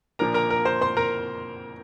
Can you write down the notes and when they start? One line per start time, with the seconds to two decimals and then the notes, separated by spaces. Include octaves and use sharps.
0.19 A#2 F3 A#3 D4 A#4 A#5
0.34 A#4 A#5
0.50 A#4 A#5
0.65 C5 C6
0.81 C5 C6
0.97 A#4 A#5